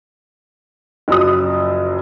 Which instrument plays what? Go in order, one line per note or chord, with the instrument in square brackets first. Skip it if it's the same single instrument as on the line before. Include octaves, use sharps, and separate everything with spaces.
[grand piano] F#1 F3 F#3 D#6